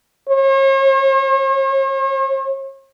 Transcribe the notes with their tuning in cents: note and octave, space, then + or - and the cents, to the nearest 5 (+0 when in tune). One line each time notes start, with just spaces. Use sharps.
C#5 -45